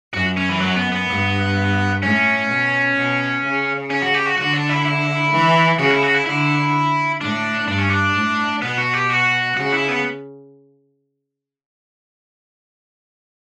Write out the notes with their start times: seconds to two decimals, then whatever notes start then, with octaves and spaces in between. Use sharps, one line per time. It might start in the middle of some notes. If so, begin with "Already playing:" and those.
0.14 F#2 F#4
0.37 C#4
0.49 E3
0.61 F#3
0.76 B3
0.92 B3
1.08 G2
2.02 A2 C#4
2.50 B2
2.97 B2
3.43 C#3
3.91 C#4
4.02 F#4
4.14 G4
4.26 F#4
4.38 D3 F#4
4.54 D4
4.69 E4
4.85 E4
5.32 E3
5.79 C#3 F#4
5.91 E4
6.03 F#4
6.15 E4
6.26 D3 E4
7.21 A2 D4
7.68 G2 D4
7.78 C#4
7.89 D4
8.15 A2
8.62 B2 B3
8.78 F#4
8.93 G4
9.10 F#4
9.56 C#3 F#4
9.72 E4
9.88 B3